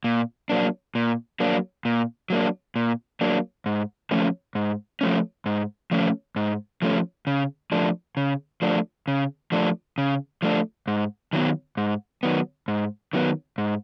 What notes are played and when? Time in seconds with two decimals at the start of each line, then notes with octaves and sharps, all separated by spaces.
0.04 A#2
0.50 F#3 A#3 D4
0.95 A#2
1.40 F#3 A#3 D4
1.85 A#2
2.30 F#3 A#3 D4
2.76 A#2
3.21 F#3 A#3 D4
3.66 G#2
4.11 F3 A3 C#4
4.55 G#2
5.01 F3 A3 C#4
5.46 G#2
5.91 F3 A3 C#4
6.36 G#2
6.82 F3 A3 C#4
7.27 C#3
7.72 F3 A3 D4
8.17 C#3
8.62 F3 A3 D4
9.08 C#3
9.52 F3 A3 D4
9.98 C#3
10.42 F3 A3 D4
10.88 G#2
11.33 D#3 F#3 B3
11.77 G#2
12.23 D#3 F#3 B3
12.68 G#2
13.13 D#3 F#3 B3
13.58 G#2